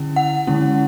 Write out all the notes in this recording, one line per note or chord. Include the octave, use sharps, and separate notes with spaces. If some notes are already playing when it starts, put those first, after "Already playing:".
Already playing: D3 C#4 E4
F#5
D3 G#3 C#4 E4